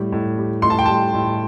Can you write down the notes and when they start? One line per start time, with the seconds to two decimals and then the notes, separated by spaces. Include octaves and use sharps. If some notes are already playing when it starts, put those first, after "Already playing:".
Already playing: A2 G3
0.12 A2
0.38 G3
0.62 A2 C6
0.70 A5
0.79 G5
0.86 G3 A5
1.14 A2